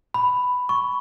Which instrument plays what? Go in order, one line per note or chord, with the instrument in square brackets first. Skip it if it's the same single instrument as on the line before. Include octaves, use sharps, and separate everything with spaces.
[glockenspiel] B5
C#6